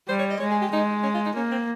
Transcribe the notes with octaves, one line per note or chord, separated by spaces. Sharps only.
G3 C5
C#5
D#5
G#3 C#5
G#4
G4
G#3 D#4
C#4
F4
D#4
A#3 C#4
C4